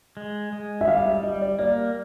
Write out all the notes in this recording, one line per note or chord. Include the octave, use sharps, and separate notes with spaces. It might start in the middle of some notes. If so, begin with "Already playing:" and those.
G#3
G#3
E5
G3 F5
E5
G3 D#5
D5
A#3 D5